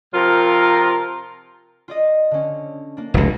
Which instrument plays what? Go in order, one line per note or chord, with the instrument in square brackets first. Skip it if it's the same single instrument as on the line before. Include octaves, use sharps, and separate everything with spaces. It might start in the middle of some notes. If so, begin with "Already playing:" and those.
[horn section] C3 F3 F4 A#4
[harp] F4 D5 D#5
D3 C#4
A#3 D4
[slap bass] F1 C#2